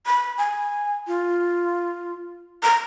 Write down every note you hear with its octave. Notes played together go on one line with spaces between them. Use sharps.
B5
G#5
F4
A#5